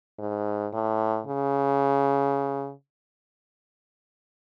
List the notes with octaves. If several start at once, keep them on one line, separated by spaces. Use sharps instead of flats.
G#2
A2
C#3